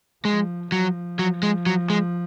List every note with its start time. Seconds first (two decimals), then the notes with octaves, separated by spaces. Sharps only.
0.25 F3 G#3
0.72 F3 F#3
1.19 F#3
1.43 G#3
1.66 F#3
1.90 G#3